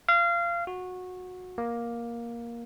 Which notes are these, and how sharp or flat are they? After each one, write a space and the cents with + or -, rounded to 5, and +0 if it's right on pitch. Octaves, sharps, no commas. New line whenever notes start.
F5 -25
F#4 -20
A#3 +10